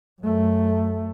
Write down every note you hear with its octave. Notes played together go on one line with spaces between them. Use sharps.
F#2 A3